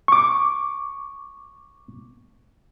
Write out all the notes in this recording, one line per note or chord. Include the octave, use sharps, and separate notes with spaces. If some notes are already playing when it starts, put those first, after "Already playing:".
C#6 D6